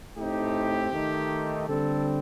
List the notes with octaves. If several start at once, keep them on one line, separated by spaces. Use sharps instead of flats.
A2 A3 C4 D#4 G4
D#3 A3 D#4
D3 G3 C4 A4